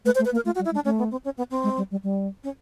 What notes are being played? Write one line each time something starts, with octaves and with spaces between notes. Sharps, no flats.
A3 B4
C5
A3
B4
A#3
A#4
A3 F4
F#4
G3
E4
G#3
D4
A3 C#4
B3
C4
C#4
B3
C4
G#3
G3
G3
G3
C#4